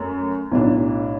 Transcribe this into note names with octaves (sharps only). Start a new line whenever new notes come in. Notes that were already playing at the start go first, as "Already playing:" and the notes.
Already playing: F#2 A3
B1 A2 F#3 D4